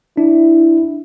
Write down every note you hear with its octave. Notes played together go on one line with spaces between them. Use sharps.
D4 E4